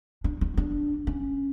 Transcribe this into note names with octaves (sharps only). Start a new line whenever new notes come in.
D4
D#4
D4
C#4